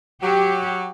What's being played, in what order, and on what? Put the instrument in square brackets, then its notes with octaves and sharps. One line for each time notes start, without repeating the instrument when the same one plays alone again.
[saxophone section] F#3 [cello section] G4